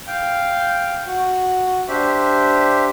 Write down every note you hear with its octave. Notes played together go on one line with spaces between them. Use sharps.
F5 G5
F#4
D4 G4 C5 E5